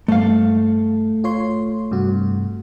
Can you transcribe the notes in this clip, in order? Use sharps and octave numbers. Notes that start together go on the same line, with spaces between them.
G2 A3 F5
F4 C#5 C6
G2 C3 F#4